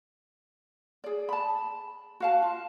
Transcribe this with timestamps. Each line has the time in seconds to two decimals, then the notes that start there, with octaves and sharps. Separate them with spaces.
1.04 G#4 D5
1.29 A5 B5
2.20 F#4 F5 A5
2.42 F4